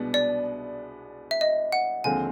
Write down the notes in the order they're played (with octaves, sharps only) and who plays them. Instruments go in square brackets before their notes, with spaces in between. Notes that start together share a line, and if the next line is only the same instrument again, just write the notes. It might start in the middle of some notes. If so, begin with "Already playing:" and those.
Already playing: [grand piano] C2 B2 G#3 B3 D4
[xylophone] D5
E5
D#5
F#5
[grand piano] D#2 D3 F3 G#3 C4 [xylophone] G#5